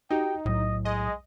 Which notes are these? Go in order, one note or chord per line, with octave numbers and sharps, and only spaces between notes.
D#4 F#4 G4 G5
B1 A2 F#3 D#5
G#3 D#5